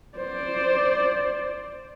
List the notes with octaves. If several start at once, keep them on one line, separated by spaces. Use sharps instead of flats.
C5 D5